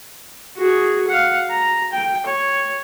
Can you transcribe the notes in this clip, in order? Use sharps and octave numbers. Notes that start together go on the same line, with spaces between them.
F#4 G#4
F5 F#5
A#5
G5
C#5